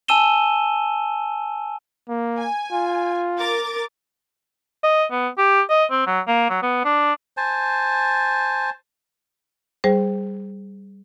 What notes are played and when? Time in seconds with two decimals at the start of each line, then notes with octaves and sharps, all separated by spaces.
0.08 G#5 A5 E6 D#7 E7 G7
2.09 A#3
2.40 G#5
2.72 F4
3.39 A#4 D6 A6
4.84 D#5
5.12 B3
5.38 G4
5.70 D#5
5.91 C4
6.07 F#3
6.27 A#3
6.50 F#3
6.62 B3
6.85 D4
7.37 C5 G#5 A5
9.84 G3 G#4 C5